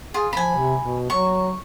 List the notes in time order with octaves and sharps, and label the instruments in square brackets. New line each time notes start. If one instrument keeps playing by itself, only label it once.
[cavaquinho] F4 [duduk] G#4
[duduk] F3 [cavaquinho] G#5 B5
[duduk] C3
B2
[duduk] F#3 [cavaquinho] C#6